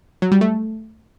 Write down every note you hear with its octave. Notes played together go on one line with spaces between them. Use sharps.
F#3
G3
A3